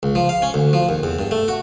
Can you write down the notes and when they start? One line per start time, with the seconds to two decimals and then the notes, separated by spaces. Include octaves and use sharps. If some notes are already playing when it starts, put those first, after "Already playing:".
0.03 C#2
0.15 F3
0.29 F5
0.42 C#4
0.54 D2
0.73 F3
0.89 D#2
1.03 E2
1.19 G2
1.31 A3
1.48 F#4